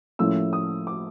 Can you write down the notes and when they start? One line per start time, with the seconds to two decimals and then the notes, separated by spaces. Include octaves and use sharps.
0.19 A2 F3 A#3 C#4 E4 E6
0.53 D#6
0.87 D6